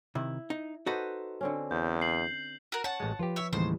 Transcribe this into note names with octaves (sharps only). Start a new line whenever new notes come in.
C3 D#3 E4
D#4
D#4 F#4 A4 B4 C5 D#5
D3 C4 C#4
E2 G6
C7 F#7
F#4 A#4
C#5 F#5 A5
A1 G#3
F3 F4 G4 B4
C#5 E5
D#2 A2 C#3 E3 G3 C5